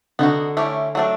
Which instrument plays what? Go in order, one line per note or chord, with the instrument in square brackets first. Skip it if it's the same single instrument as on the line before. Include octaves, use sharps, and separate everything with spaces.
[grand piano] D3 [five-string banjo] B3 D#4 F#4
[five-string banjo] A3 C#4 E4 G4
F#3 A3 D4